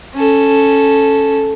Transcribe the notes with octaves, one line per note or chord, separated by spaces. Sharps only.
C#4 A4